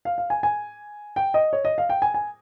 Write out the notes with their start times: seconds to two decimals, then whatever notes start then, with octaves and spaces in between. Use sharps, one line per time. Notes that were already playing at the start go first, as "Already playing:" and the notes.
0.05 F5
0.18 F5
0.30 G#5
0.43 G#5
1.16 G5
1.34 D#5
1.53 C#5
1.65 D#5
1.78 F5
1.89 G5
2.02 G#5
2.14 G#5